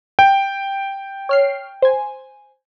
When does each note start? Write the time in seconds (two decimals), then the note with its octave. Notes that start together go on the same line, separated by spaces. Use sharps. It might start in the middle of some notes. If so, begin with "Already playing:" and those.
0.19 G5
1.29 C#5 F6 C7
1.82 C5 G#5